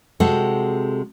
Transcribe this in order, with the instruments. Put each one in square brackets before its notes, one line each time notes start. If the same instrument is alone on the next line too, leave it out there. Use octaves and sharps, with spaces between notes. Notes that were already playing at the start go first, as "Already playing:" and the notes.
[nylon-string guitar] C3 G#3 F#4 A4